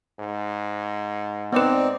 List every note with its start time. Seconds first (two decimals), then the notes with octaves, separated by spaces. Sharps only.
0.19 G#2
1.53 B3 C4 D#4 B4 D5